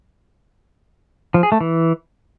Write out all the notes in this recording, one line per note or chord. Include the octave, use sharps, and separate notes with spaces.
F3
G#4
A3
E3